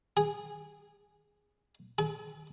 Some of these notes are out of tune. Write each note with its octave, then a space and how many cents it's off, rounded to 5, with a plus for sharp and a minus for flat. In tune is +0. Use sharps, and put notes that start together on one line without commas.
G#4 -5
G#4 +45